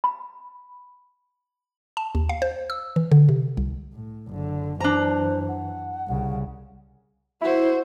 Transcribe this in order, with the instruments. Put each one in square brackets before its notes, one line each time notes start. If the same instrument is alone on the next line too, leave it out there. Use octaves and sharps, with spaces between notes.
[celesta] B5
[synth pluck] A5
D#2
F5
C5
E6
E3
D3
C3
C2
[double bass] A2
F#1 D3
[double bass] F#2 E3 [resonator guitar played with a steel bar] D4 A#5 [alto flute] C5
[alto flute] F#5
[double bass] C2 C#3
[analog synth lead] E4 [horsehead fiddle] F#4 C5